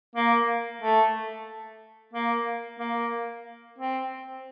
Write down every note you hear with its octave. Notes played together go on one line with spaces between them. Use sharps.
A#3
A3
A#3
A#3
C4